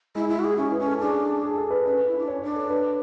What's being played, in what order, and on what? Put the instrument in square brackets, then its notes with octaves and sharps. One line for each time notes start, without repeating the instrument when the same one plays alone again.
[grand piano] G#3 [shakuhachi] E4
[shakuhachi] E4
[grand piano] G#3 [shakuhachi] F#4
[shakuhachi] G#4
[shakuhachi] C#4 [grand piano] E4
[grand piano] B4
[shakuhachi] C#4
[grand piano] A4
[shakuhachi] D4 [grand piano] G#4
[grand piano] G#4
A4
B4
[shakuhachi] C#4 [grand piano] B4
[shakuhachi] E4
D4
[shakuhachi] C#4 [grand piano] C#5
[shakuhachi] D4 [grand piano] C#5
[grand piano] A4
B4